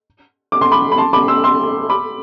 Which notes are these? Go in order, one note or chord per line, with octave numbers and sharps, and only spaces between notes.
D6
C6
B5 D6
B5
A5 C6
B5 D6
C6 E6
C6 E6
B5 D6